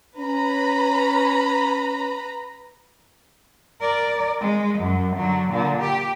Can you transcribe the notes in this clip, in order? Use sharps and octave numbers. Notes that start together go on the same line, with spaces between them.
C#4 B4 A#5 B5
A#4 D5
G#3
F#2
D3 F#3
A#2 D3
G4